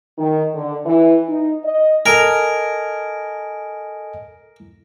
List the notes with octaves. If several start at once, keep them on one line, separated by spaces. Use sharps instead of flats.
D#3
D3
E3
D#4
D#5
A4 A#4 D#5 G#5